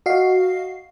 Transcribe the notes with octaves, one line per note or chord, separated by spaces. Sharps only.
F#4 D#5 F5 C7